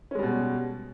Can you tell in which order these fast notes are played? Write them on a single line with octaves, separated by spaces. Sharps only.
C#4 G#3 G3 B2